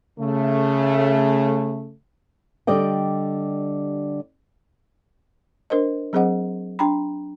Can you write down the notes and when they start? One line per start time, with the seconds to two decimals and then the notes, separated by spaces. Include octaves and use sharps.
0.19 C#3 A3
2.67 D3 G3 G4 D5 D#5 G5
5.70 D4 A#4 C5 D#5
6.13 F#3 C4 G#4 C5 D#5 F#5
6.79 D4 G5 A#5 B5